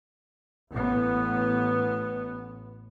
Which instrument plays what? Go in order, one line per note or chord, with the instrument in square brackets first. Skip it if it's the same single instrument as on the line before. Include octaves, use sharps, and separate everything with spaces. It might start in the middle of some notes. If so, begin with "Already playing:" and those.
[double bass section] A1 B3